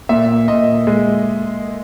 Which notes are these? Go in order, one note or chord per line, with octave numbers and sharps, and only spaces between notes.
A#2 E5
A#2 D#5
G#3